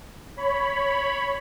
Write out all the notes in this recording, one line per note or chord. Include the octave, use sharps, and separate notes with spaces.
C#5 B5